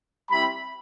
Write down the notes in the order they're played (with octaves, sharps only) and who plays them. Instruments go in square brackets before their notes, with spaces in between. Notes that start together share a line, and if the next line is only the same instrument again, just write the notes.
[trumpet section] G3 C4 E4 B5